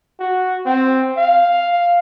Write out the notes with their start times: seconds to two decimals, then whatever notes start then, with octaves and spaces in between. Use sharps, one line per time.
0.19 F#4
0.65 C4
1.18 F5